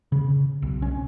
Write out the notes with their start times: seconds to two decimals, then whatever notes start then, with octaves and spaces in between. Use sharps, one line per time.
0.12 C#3
0.62 B1
0.82 C#4